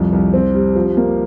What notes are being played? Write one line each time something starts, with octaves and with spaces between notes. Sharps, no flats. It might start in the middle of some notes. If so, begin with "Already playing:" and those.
Already playing: C2 F2
C2
C4
G3
F3
A#3